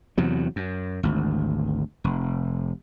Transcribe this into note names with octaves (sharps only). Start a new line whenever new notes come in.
E2 C3 F#3
F#2
G#1 D2
F1